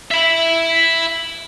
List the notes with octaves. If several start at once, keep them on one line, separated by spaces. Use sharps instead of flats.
E5 B5